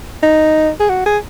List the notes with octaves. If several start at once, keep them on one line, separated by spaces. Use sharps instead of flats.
D#4
G#4
F#4
G#4